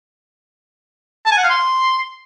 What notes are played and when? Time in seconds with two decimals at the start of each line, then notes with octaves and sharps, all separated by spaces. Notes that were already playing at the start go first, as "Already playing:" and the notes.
1.26 A5
1.32 G#5
1.37 F#5
1.43 F5
1.49 C6